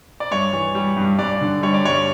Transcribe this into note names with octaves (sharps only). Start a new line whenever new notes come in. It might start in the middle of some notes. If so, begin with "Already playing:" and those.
D5
G2 C#5
E3
G3
G2
G2 D5
D3
G3 C#5
D5
G2 C#5